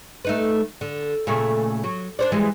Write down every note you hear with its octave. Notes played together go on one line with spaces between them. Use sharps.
A3 D#4 B4
D3
A#2 C#3 A3
F#3
D4 C5 D5
E3 G3 G#3